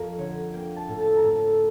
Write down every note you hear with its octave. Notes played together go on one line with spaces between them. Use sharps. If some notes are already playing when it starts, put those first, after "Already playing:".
Already playing: F2 A#4
D3 C#5
A#3 G5
A5
A2
A5
A#5
A2 A5